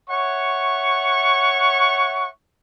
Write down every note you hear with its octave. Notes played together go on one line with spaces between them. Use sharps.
C#5 E5 F#5 C#6